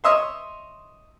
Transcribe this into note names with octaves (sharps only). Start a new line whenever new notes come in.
C#5 D#5 E5 C6